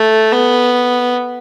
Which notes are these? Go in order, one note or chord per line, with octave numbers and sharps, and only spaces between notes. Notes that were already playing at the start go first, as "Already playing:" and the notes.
Already playing: A3
B3